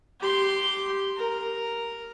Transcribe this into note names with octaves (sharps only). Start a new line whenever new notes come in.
G4 C6
A#4